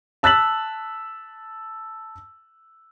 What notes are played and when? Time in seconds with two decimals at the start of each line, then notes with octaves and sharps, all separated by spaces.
0.23 A5 E6 F#6 A6 B6 F#7